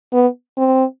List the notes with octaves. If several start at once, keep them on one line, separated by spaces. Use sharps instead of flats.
B3
C4